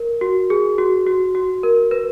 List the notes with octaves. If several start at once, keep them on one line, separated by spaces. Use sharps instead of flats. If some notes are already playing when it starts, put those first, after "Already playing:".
Already playing: A#4
F#4
G#4
F#4
F#4
F#4
A#4
B4